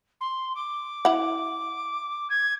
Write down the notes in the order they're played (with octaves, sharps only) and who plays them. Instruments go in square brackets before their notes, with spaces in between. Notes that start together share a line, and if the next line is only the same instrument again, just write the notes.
[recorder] C6
D6
[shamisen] E4 F#5
[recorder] G#6